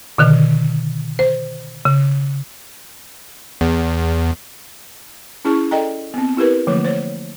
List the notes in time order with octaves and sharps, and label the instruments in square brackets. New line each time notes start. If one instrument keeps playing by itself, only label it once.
[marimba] B2 D3 D#3
C5
C#3
[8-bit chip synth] E2
[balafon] C#4 E4 G#4 A5 C#6
A4 D5 D#5 G5 A#5
B3 C4
E4 G4 A#4 B4
D3 E3 F3 A3 A#3
C5 C#5